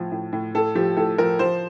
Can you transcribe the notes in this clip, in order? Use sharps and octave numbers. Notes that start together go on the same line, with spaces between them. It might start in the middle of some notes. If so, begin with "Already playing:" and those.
Already playing: A2 F3
A2
A2
A2 A4
F3 G4
A2 A4
F3 A#4
F3 C5